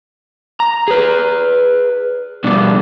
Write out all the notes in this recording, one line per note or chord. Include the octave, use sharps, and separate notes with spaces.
A#5
G#4 B4
B2 G3 B3 D4